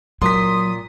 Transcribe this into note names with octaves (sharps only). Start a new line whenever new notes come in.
A#2 F#3 C6 D#6 B6